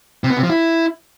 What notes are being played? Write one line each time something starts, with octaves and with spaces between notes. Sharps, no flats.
C3
B3
C3
F3
E4